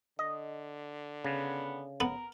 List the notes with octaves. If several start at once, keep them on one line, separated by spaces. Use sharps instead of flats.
D3 D#5
C#3 B3
B3 A#4